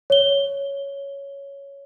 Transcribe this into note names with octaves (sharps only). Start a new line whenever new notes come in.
C#5 G7